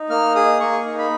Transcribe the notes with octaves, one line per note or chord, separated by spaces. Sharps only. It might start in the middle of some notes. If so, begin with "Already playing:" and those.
Already playing: D#4
A#3 F6
G#4 D#6
A#3 C#6
D#4
B5